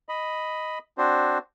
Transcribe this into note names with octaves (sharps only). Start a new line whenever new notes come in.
D#5 B5
C4 D4 F#4 C5